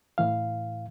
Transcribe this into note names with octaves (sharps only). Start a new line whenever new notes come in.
A2 E3 F5